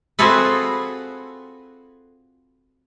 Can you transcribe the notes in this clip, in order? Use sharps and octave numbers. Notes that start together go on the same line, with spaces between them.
C4 F4 F#4 G#4 A4 B4